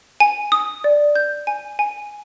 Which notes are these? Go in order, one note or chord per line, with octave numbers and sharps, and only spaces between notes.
G#5
D#6
D5
G6
G#5
G#5